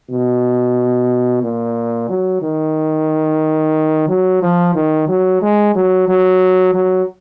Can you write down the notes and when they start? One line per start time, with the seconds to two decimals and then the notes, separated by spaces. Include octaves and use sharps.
0.11 B2
1.43 A#2
2.09 F#3
2.42 D#3
4.09 F#3
4.42 F3
4.75 D#3
5.08 F#3
5.42 G#3
5.75 F#3
6.08 F#3
6.74 F#3